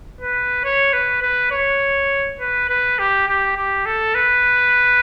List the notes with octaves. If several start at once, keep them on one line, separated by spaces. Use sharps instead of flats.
B4
C#5
B4
B4
C#5
B4
B4
G4
G4
G4
A4
B4